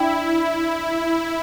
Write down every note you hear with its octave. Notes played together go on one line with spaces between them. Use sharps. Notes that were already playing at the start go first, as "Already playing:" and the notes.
Already playing: D4 E4 E5 G5